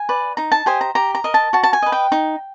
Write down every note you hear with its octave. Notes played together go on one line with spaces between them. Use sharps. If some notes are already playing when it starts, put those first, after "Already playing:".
Already playing: G#5
B4 D5
D#4 A#5
A5
G4 C5 D#5 G#5
A#5
G4 A#5
A#5
A#4 D#5
A5
F#4 A5
A5
G#5
B4 D#5
G5
D#4